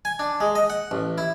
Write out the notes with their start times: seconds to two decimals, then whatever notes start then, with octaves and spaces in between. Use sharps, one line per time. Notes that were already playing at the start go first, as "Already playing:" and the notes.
0.05 G#5
0.19 D4
0.40 G#3
0.55 D#5
0.70 F#5
0.91 A1
1.18 E4